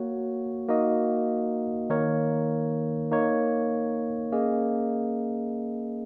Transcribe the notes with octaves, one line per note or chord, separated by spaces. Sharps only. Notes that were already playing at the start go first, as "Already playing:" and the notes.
Already playing: A#3 F#4 C#5
A#3 D#4 F#4 D#5
D#3 A#3 D#4 A#4 C#5
A#3 D#4 A#4 C#5
A#3 C#4 G#4 D#5